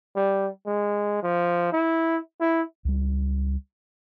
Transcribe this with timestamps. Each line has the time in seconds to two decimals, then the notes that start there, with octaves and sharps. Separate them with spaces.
0.16 G3
0.66 G#3
1.23 F3
1.72 E4
2.40 E4
2.85 C#2 G3